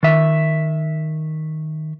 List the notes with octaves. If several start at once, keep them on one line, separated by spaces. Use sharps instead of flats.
D#3 E5